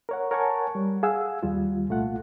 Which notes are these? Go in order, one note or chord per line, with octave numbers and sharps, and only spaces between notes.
A#4 C#5 F#5
A#4 C#5 F#5 G#5 A5 C#6
G3
G#4 F5 F#5 G#5 E6
D#2 G3 F4
C2 A#2 A3 F4 F#5